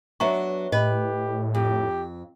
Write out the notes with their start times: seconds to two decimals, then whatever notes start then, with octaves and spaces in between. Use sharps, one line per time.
0.20 F#3 B3 D4 E5 A#5 C#6
0.72 A2 G4 B4 D#5
1.55 F2 G4